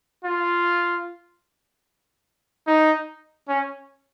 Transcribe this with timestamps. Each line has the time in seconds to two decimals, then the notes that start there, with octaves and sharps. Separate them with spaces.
0.24 F4
2.67 D#4
3.48 C#4